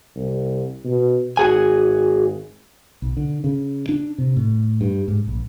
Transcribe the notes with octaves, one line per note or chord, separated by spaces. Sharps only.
C2
B2
G#1 F#4 G#4 G#5
B1
D3
C#3
D4
C3
A2
G2
G#2
A#1